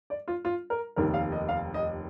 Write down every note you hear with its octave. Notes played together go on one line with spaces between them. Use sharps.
D5
F4
F4
A#4
F1 D#2 D#3 A#4
F5
D#5
F5
D#5